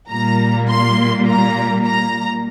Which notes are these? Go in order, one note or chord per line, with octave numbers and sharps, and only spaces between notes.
A#2 G3 A#3 A#5
C6
A#5
A#5